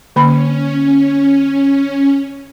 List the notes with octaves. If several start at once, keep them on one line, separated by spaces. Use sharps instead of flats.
D3 A#3 C#4 B5